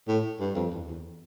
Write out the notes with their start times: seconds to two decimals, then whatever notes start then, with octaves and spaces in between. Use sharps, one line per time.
0.08 A2
0.40 G2
0.55 F2
0.71 E2
0.88 E2